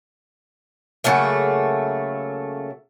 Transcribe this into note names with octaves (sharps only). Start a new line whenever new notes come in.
C#3 F#3 A3 A#3